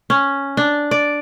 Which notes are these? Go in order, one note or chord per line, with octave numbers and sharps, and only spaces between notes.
C#4
D4
D5